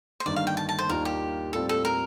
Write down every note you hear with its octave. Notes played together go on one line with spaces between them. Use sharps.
C5
G1 G2 D#3 A#3 D5
F5
G5
A5
A5
C5
D#2 D#3 G3 A#3 F4 A#4
G4
A2 G3 C4 F4 A4
A4
A#4